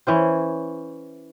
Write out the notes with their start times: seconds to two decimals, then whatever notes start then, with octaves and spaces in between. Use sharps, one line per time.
0.07 E3 C#4 C5